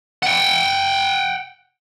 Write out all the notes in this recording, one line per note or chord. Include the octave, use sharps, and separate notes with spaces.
F#5 G5